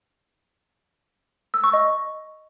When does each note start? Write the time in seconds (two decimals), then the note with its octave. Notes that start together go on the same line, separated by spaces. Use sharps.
1.54 E6
1.64 C#6
1.73 D#5